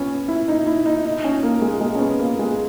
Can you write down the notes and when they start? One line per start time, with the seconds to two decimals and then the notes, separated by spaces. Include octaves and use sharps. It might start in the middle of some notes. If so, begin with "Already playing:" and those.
Already playing: B3 C#4
0.28 E4
0.48 D#4
0.66 E4
0.86 D#4
1.05 D#4
1.24 C#4
1.43 A#3
1.62 G#3
1.81 G#3
1.95 C#4
2.00 B3
2.19 A#3
2.39 G#3